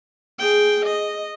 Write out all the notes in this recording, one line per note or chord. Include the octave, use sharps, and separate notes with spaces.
G#4 G5
D#5